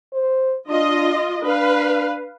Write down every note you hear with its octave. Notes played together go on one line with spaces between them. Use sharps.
C5
D4 F4 D#5
D4 B4 F5